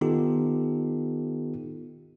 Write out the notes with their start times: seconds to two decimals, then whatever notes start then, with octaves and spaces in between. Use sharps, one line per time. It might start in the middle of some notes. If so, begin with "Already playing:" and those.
0.01 D#3 B3 D#4 F4 G4 A4